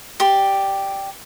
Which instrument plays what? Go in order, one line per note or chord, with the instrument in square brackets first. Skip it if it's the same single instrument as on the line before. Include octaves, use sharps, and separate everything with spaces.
[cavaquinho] G4 D5 C6